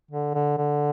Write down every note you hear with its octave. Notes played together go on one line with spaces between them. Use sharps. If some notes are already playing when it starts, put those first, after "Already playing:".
D3
D3
D3